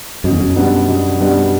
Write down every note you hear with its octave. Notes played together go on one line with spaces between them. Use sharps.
F#2 B2
E2
F#2
G3 B3 D4
B2
G3 B3 D4